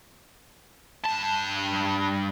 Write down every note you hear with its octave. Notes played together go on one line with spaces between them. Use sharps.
G2 A5